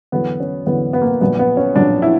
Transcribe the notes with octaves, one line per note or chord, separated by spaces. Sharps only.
E2 D3 F#3 B3
C#4
E2 D3 F#3 B3
B3
A#3
B3
A#1 A#2 F#3 B3
B3
C#4
A#1 A#2 F#3 D4
E4